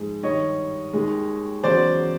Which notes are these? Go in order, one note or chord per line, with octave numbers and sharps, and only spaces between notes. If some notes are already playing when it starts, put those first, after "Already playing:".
Already playing: G#2 F3 G#3
G2 D#3 G3 C#5 D#5
D#2 D#3 G#3
E2 C#3 F#3 C5 D5